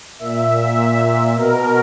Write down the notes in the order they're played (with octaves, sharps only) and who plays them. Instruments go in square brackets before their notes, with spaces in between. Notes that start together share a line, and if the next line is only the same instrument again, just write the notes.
[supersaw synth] A#2 E5
A#2
B2 A#4